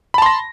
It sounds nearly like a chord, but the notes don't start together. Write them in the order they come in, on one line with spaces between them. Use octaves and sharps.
B5 A5 C6 A#6